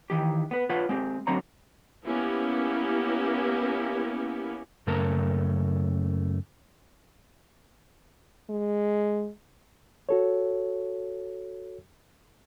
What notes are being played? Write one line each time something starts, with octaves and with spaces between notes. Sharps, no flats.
D#3 E3 G4
B3 B4
F4 B4 C#5 F#5
G#3 C4 G4
D3 F#3 C4 C#5 A#5
A#3 B3 C#4 E4 G4
F#2 C#3 A3 A#4 A5 A#5
G#3
F#4 A4 C#5